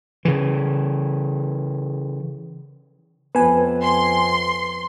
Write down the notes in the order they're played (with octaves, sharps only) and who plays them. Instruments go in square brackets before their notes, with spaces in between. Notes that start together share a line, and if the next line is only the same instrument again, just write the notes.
[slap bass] C#3 E3
[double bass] F2 [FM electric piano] B3 G#5 [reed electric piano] B4
[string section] C6